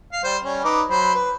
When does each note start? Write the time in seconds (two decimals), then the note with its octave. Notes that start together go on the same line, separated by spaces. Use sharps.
0.12 F5
0.24 G3 C5
0.44 G3 C#4
0.64 D#4 B4 D6
0.90 F#3 C5 B5
1.14 B4